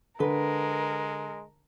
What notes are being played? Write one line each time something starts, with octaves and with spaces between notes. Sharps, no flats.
D3 G#3 A#4 B4